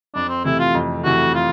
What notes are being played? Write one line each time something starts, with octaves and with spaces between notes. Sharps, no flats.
F2 D4
C4
C3 E3 A3 E4
F4
F2
C3 E3 A3 F#4
F4